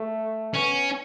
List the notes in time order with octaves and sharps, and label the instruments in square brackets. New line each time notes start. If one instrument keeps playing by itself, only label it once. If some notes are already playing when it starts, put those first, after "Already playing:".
Already playing: [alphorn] A3
[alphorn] B3 [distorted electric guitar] C#4